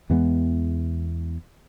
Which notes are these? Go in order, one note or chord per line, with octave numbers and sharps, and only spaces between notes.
E2 E3 G#3 B3